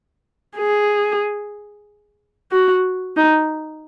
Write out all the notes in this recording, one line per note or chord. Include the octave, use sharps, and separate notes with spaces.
G#4
F#4
D#4